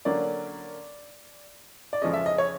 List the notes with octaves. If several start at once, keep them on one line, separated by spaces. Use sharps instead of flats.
D3 F#3 A#3 C#4 D5
D5
F2 C#3 F3 G#3 C#4 D#5
E5
D#5
C#5